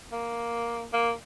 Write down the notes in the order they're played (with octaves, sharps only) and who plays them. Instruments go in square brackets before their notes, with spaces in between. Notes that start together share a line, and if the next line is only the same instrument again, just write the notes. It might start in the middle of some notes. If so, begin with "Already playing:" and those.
[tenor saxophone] A#3
A#3